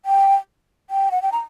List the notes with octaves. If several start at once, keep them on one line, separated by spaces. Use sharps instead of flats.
G5
G5
F#5
G5
A#5